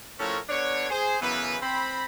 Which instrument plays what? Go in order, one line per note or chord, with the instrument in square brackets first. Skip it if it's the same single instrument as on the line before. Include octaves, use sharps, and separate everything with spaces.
[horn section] A2 F3 C#4 A4 A#4 C#5
D3 B3 D4 C#5
G#4 C5
F#2 C#3 E3 B3 B4
C4 B5